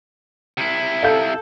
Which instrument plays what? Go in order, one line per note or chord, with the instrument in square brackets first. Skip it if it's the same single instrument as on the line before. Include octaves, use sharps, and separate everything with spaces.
[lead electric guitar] C3 E4
[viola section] A4 [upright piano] F5 G6